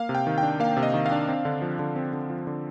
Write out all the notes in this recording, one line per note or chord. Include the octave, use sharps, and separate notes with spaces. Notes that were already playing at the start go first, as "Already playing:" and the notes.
Already playing: A#3 F5
C3
G5
D#3
G5
D4
A#3 F5
C3
D#5
D#3
F5
D4
C4
D3
F3
D3
C4
D3
F3
D3